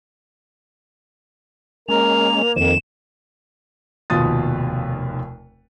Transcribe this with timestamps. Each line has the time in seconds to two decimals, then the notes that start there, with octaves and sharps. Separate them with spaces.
1.88 G#3 A#3 C#4 A#4 F7
2.56 F2 D#3 F3 E7
4.10 F1 D#2 B2 F4 D#6 A6